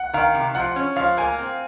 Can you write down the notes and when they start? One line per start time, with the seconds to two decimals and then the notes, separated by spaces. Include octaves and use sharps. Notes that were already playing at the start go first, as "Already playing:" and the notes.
Already playing: F#5
0.13 D#3 F5
0.34 C3
0.55 F3 F#5
0.76 C#4
0.96 F3 F5
1.17 A#3 G#5
1.38 C4